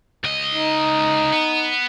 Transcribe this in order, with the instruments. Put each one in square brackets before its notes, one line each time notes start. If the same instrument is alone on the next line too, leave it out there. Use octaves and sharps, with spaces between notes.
[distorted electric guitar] C#2 D#5
[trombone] D#4
[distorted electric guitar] B3